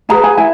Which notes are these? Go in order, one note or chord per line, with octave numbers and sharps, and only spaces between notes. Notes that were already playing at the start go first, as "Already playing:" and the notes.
E4 G#4 B4 A#5
G#5
E4 G#5